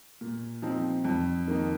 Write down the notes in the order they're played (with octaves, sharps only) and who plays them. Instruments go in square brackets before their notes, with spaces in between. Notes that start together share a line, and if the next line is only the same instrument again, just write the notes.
[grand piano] A#2
F3 C4 D#4
F2
D#3 A#3 D#4